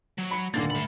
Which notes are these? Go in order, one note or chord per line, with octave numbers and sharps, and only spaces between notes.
F#3
B5 C#7
D#1 D3 A#3 A6
A3 B5